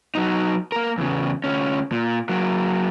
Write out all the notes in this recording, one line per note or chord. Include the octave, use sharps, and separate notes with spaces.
F#3 D#4
A#3 A#4
E2 C#3
D2 C#4
A#2
F#3 A#3